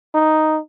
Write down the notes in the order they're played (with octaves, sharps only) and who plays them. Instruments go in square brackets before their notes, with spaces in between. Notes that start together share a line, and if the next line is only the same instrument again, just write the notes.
[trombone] D#4